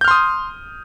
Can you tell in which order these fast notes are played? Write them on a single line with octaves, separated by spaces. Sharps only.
G6 F6 C6 D#6